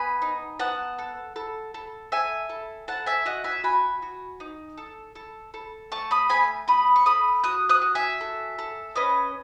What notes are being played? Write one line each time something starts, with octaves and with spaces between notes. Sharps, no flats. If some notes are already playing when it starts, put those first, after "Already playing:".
Already playing: B3 G#5 B5
D#4
B3 F#5 A5
A4
A4
A4
A4 E5 G#5
A4
A4 F#5 A5
E5 G#5
F#4 D#5 F#5
E5 G#5
F#4 G#5 B5
F#4
D#4
A4
A4
A4
A3 A5 C#6
B5 D#6
A3 G#5 B5
A3 B5 D#6
C#6
A3 B5 D#6
F#4 D#6 F#6
D#6 F#6
F#4
E5 G#5
A4
A4
C#4 B4 D#5